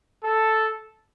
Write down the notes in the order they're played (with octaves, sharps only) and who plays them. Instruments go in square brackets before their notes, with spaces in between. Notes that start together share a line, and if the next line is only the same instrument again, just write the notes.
[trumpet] A4